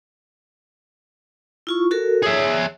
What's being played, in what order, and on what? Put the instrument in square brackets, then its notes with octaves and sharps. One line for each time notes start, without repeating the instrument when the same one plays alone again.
[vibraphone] E4 F4 C#6
F#4 A4 A#4
[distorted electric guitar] G#4 E5 [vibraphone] C#5